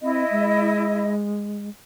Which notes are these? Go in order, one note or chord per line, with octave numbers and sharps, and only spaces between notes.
C4 E4 D#5
G#3